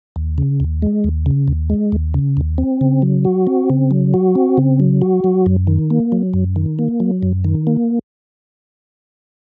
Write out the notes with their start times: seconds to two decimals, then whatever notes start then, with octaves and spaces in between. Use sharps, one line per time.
0.16 D#2
0.38 C#3
0.60 D#2
0.82 G#3
1.04 D#2
1.26 C#3
1.48 D#2
1.70 G#3
1.92 D#2
2.14 C#3
2.37 D#2
2.58 C4
2.81 C#3
3.02 F#3
3.25 F#4
3.47 C4
3.70 C#3
3.91 F#3
4.14 F#4
4.35 C4
4.57 C#3
4.80 F#3
5.02 F#4
5.24 F#3
5.46 F#2
5.67 D#3
5.90 A#3
6.12 F#3
6.34 F#2
6.56 D#3
6.79 A#3
7.00 F#3
7.23 F#2
7.44 D#3
7.67 A#3